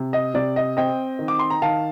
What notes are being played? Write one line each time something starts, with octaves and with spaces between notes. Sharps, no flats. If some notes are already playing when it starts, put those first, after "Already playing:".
Already playing: C3
D#5
C3 D5
D#5
C4 D#5 G5
D#3
D6
C6
A#5
D#3 F5 A5